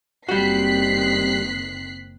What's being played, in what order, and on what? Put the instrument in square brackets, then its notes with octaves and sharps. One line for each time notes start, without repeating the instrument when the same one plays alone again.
[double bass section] F#1 D#3 C4 [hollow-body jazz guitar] G3 F#4 [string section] F#6 B6 C7